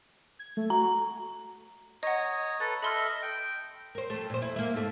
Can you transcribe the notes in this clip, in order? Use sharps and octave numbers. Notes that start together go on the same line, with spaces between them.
G#6
A3
F#4 A#5
C#5 D#5 F#5 A#5 D#6
A4 B4 A6
A4 D#5 E5 B5 C6 F6
D#5
G5
A#4 C5
F2 A3
A#2 C5
E4
A#3 E4
G#2 A3